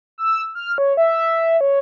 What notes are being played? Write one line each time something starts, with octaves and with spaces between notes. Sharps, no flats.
E6
F6
C#5
E5
C#5